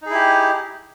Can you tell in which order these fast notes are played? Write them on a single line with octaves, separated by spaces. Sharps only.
D#4 G#4 E4 G4